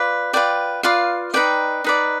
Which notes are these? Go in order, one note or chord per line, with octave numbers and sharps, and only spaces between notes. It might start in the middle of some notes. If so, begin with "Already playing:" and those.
Already playing: F4 B4 D5
F4 B4 D5 G5
F4 B4 D5 F5
D#4 B4 D5 G5
D#4 B4 D5